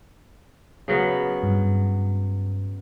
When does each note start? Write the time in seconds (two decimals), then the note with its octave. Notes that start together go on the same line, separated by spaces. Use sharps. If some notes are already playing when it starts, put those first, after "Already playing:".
0.88 C#3 F#3 B3
1.43 G2